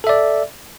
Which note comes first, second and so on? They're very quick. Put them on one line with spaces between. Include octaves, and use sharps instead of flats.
A4 E5 D5